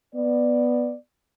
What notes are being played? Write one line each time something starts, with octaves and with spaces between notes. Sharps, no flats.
B3 D5